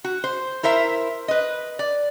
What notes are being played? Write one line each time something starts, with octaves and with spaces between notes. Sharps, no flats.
F#4
C5
E4 A#4 C5 E5
B4 D#5
D5